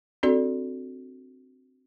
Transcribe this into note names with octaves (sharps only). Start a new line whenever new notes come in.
C4 D4 F#4 A4 D5